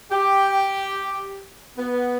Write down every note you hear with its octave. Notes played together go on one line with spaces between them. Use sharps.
G4
B3